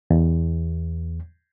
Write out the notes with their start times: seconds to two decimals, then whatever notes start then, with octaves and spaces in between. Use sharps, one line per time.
0.11 E2